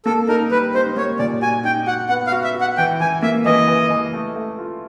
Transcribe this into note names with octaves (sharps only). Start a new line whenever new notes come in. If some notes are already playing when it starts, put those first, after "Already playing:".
A#3 A4
D#4 A#4
G3 B4
D#4 C5
A#3 C#5
A#2 D5
F#4 G#5
D#4 G5
F#4 F#5
B3 F#5
F5
F#4
E5
F#4
F#5
E3 G5
E3 G#5
A#3 E5
E3 D#5
E3
E3
A3
A3
F4